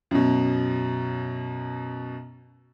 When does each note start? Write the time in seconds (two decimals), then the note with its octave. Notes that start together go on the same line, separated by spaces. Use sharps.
0.11 F#2 B2